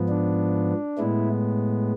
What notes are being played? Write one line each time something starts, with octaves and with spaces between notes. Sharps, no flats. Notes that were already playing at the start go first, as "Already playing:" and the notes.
Already playing: G#2 F3 B3
D4
A2 G#3 B3 E4